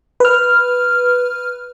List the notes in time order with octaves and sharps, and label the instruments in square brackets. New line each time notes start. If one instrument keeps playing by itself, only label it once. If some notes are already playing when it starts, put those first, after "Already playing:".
[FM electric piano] B4 F6